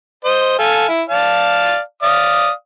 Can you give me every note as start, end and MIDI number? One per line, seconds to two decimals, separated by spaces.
0.25 0.59 72
0.25 0.59 75
0.59 0.86 69
0.59 0.86 77
0.59 0.86 80
0.88 1.02 64
1.09 1.79 74
1.09 1.79 77
1.09 1.79 81
2.03 2.51 74
2.03 2.51 77
2.03 2.51 87